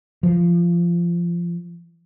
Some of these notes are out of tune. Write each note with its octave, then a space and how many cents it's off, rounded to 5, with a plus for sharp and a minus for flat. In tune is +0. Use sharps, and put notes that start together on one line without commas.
F3 -20